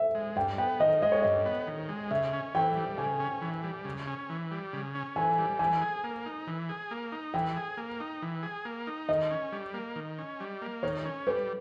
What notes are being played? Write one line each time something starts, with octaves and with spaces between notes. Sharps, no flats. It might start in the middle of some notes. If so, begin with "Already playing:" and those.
Already playing: E5
G#3
G2 G5
B3 G5
D#3 D#5
G#3 D#5
C#5
G2 D#5
B3
D#3
G#3
C#3 E5
C#4
E3 G5
G3
C#3 G#5
C#4
E3
G3
C#3
C#4
E3
G3
C#3
C#4
E3 G#5
G3
E3 G#5
G#4
A#3
D#4
E3
G#4
A#3
D#4
E3 G5
G#4
A#3
D#4
E3
G#4
A#3
D#4
D#3 D#5
C#4
G3
A#3
D#3
C#4
G3
A#3
D#3 C#5
C#4
G3 B4